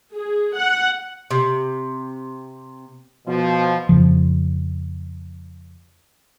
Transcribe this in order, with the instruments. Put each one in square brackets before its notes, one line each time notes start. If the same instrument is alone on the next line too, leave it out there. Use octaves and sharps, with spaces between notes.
[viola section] G#4
F#5
[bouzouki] C3
[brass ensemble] B2 F3
[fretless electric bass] F2 C#3 F3